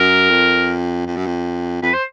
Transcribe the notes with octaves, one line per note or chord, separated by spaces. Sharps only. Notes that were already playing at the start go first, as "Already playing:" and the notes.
Already playing: F#2 A#4
F2
F2
F#2
F2
F2 B4
C5